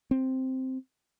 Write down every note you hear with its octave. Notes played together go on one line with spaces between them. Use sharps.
C4